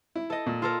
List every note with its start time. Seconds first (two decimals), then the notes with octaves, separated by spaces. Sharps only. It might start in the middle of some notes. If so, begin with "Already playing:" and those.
0.16 E4
0.30 A4 D#5
0.46 A#2
0.62 F4 A4 A#4